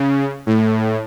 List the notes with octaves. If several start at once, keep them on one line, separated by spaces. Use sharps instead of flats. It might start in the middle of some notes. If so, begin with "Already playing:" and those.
Already playing: C#3
A2